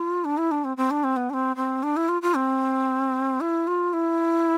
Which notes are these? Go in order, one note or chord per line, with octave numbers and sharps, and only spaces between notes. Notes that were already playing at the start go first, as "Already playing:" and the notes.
Already playing: F4
D4
E4
D4
C4
C4
D4
C4
B3
D4
C4
C4
D4
E4
F4
F4
C4
E4
F4
E4